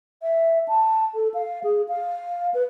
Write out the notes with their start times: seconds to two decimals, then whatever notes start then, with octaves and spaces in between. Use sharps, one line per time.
0.22 E5
0.68 A5
1.15 A4
1.34 F5
1.64 G#4
1.88 F5
2.54 B4